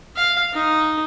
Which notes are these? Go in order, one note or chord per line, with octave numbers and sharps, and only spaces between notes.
F5
D#4